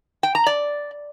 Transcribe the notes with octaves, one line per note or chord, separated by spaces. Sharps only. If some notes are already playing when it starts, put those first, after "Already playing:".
G5
A#5
D5